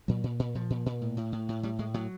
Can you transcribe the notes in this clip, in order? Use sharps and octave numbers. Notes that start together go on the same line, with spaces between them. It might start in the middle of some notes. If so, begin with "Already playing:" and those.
A#2 F#3
A#2
A#2
A#2 F3
A#2
A#2
A2
A2
A2
A2
A2 G3
A2 G#3
A2 F#3